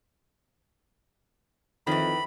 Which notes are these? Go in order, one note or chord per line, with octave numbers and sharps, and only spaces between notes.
F2 D#3 E3 B5